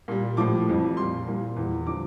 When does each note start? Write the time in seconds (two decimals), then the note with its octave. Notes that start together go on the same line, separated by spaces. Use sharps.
0.08 A#2 G3
0.37 A2 F3 D6
0.68 F2 E3 G3
0.97 A#2 G3 C6
1.27 A#2 G3
1.56 E2 E3 G3
1.87 D3 F3 D6